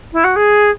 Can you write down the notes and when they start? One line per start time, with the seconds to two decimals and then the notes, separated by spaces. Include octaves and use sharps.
0.13 E4
0.24 F#4
0.36 G#4